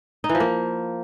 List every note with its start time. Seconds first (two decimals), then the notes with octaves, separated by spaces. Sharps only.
0.24 D#4
0.29 E3
0.35 F3
0.40 A#3